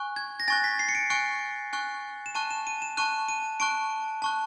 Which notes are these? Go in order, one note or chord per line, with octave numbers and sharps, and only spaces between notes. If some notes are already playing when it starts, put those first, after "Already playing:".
Already playing: G#5 C#6 F#6
G#6
A#6
G#5 C#6 F#6 A6
B6
C7
C#7
D7
G#5 C#6 F#6 D7
G#5 C#6 F#6
E7
A5 C#6 F#6 D#7
E7
D#7
E7
A5 C#6 F#6 D#7
D#7
A5 C#6 F#6 D7
A5 C#6 F#6